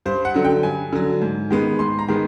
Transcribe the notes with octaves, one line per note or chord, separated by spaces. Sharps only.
G2 C5
F#5
D3 F#3
G5
G2 G#5
D3 F#3
G#2
D#3 G#3 B3
G#2 C6
A#5
D#3 G#3 B3